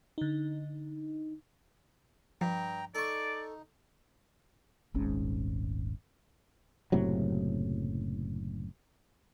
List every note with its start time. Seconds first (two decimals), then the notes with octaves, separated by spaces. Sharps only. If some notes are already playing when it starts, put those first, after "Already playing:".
0.18 D3 D#4
2.41 G2 F3 G5 A#5
2.95 D#4 A4 D5 C#6
4.94 D#1 G#1 G#2 C#4
6.92 F#1 A2 C3 F#3